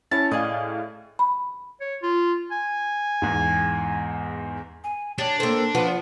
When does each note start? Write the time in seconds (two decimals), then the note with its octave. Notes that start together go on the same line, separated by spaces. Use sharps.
0.11 C#4 E4 C#5 A5
0.31 A2 G#4 D5 D#5 F5
1.19 B5
1.80 C#5
2.03 F4
2.51 G#5
3.22 E2 G#2
4.84 G#5
5.18 D4 G4 C#5
5.40 A#3 C4 A4
5.75 F3 F4 B4 F#5